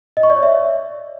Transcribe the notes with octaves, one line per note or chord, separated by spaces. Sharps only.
D#5
C#6
D5
C#5
E5